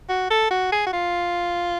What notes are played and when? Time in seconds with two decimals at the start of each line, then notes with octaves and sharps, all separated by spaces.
0.09 F#4
0.30 A4
0.51 F#4
0.72 G#4
0.86 F#4
0.93 F4